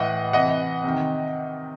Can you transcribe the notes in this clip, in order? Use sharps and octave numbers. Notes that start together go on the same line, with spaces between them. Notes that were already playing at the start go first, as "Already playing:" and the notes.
Already playing: A2 E3 D#5 F#5
C3 E3 D#5 F#5
C3 D#3